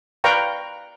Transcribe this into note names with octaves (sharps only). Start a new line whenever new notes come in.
B4 D5 F5 G5 A#5 C#6